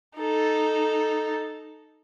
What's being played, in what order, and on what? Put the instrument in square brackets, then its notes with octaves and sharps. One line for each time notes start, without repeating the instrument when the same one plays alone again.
[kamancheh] D#4 A4